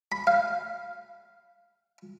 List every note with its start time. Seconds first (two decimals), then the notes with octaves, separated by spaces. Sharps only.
0.12 B5
0.27 F5